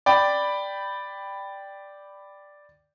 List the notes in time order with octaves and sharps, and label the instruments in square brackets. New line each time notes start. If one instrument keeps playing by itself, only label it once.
[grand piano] D5 G5 B5